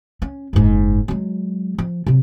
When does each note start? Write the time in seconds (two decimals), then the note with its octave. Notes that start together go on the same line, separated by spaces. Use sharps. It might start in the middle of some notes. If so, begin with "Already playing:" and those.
0.22 C#4
0.53 F#1 G#2
1.08 F#3 G#3
1.78 F3
2.07 C3 F#3